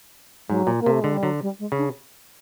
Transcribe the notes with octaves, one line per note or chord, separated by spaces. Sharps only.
G#2 F#3
A#2
A#3
C3 A3
D3 G#3
G3
D3 F#3
G3
G#3
C#3
D4